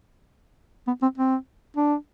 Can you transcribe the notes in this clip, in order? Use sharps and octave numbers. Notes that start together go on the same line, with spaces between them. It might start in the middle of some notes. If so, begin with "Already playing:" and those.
B3
C4
C4
D4